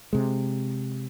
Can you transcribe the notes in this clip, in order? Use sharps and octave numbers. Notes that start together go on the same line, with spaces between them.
C3 G#3